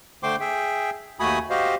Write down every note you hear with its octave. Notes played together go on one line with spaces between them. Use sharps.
D3 A3 C5 G5 C6 D6
G#4 E5 G5
D#2 A3 F#4 G#5 B5 D#6
F#4 G4 C5 D#5 F5